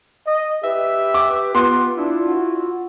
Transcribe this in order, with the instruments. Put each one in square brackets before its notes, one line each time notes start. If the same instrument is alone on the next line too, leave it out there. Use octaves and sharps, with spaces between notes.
[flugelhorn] D#5
[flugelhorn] G4 [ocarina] B4 [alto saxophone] E5
[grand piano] D6
[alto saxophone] B3 [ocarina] F4 [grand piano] C6
[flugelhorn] D4 [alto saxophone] E4
[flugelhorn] F#4